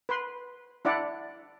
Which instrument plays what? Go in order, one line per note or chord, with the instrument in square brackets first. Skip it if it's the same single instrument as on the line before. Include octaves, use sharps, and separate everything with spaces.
[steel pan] B4 C6
D4 E4 D5 F#5